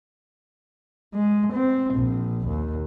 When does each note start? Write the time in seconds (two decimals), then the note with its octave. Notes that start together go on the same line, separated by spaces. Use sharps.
1.14 G#3
1.53 C4
1.94 A#1
2.47 D#2